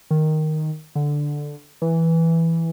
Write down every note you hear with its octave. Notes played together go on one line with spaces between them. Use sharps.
D#3
D3
E3